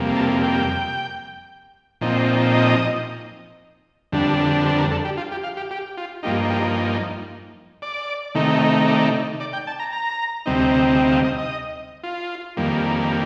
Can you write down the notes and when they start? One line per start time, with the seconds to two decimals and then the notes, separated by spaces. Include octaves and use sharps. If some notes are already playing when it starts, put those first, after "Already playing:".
Already playing: F2 C3 G3 A#3
0.16 A5
0.43 G5
2.01 A#2 F3 C4 D#4
2.54 D#5
4.12 F2 D3 G3 D4
4.66 C5
4.78 A#4
4.91 A4
5.05 G4
5.17 F4
5.32 G4
5.44 F5
5.57 G4
5.71 G4
5.97 F4
6.23 G2 F3 A#3 D#4 G4
6.50 G4
7.82 D5
8.35 C3 D#3 A3 D#4
8.88 D5
9.40 D5
9.53 G5
9.67 A5
9.80 A#5
9.93 A#5
10.46 D2 C3 G3 C4 D#4
10.98 G5
11.12 F5
11.24 D#5
11.38 D#5
12.04 F4
12.57 F2 D#3 G3 A#3